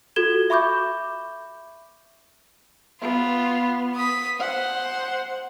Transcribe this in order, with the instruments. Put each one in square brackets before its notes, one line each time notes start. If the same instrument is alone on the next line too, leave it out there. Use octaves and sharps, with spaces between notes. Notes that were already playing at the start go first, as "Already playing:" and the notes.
[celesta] F4 F#4 A4 G#6 E7 G7
E5 B5 C#6 D6 G6
[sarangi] B3 [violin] F4
[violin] D#6 B6
[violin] C5 [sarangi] F#5